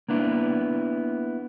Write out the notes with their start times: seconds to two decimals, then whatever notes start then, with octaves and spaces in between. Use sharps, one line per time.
0.09 A#3 B3 D4 E4